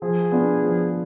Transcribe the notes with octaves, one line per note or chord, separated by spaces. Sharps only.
F3 G#4
B3 D4 F4
F3